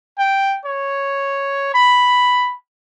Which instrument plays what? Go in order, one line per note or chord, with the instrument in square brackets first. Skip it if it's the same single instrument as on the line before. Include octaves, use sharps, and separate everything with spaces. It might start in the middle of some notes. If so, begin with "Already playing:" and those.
[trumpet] G5
C#5
B5